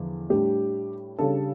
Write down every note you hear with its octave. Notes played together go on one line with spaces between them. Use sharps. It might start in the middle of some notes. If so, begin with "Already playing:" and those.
Already playing: E2 D3 F3
A2 G3 D4 G4
C#3 G3 D4 A4